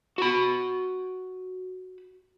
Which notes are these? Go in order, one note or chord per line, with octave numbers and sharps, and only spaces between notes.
F#4 B5